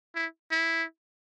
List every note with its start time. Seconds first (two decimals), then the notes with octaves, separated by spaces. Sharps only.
0.15 E4
0.52 E4